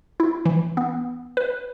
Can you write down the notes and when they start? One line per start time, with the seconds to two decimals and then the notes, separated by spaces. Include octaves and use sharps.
0.20 E4
0.45 E3
0.77 B3
1.37 B4